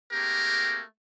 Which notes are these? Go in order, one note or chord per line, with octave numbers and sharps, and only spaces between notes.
A3 A#3 C4 G4 G#4 A#4